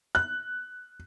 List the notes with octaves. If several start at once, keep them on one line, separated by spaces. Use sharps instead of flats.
F#6